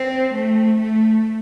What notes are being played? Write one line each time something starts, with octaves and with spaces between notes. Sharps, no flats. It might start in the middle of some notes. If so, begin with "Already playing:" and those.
Already playing: C4
A3
A3